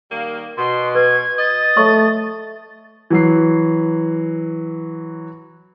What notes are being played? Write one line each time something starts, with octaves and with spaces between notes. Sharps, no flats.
D#3 G3 A#3
B2 C6
B4 G#6
D#5 A6
A3 C#5 C#6
E3 F#3 C7